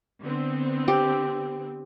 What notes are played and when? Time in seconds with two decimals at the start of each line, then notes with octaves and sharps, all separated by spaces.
0.21 D3 B3 C4
0.88 G4